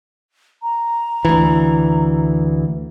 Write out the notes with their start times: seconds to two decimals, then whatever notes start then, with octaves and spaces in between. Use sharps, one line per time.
0.63 A#5
1.25 D2 E3